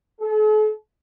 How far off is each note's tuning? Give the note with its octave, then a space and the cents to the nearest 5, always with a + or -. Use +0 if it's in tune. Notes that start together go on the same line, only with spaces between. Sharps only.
A4 -45